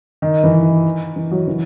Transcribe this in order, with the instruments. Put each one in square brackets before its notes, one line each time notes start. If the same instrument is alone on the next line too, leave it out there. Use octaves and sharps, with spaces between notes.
[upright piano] D#3
E3
D#3
E3
F#3
E3